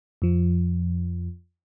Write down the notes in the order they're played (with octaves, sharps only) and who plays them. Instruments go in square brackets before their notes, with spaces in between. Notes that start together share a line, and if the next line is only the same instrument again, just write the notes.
[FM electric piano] F2 F3